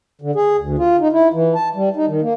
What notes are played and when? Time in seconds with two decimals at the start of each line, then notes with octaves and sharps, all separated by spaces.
0.22 D3
0.35 G#4
0.59 D2
0.78 F4
1.01 D#4
1.13 E4
1.34 E3
1.55 A5
1.75 G3
1.96 D#4
2.08 D#3
2.22 A#3